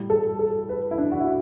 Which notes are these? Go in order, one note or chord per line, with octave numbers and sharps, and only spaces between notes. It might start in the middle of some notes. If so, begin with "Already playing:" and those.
Already playing: A2 G3
A4
A4
B4
E4
D4
F#4
E4